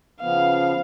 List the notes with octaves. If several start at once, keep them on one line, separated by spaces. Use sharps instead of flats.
C#3 F3 B3 F5